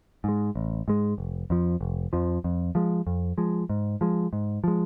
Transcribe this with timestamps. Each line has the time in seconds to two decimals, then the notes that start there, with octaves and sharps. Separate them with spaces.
0.24 G#2 G#3
0.56 A1
0.88 G#2 G#3
1.18 F1
1.50 F2 F3
1.81 F1
2.13 F2 F3
2.44 F2
2.75 F3 G#3
3.07 F2
3.38 F3 G#3
3.70 G#2
4.01 F3 G#3
4.33 G#2
4.64 F3 G#3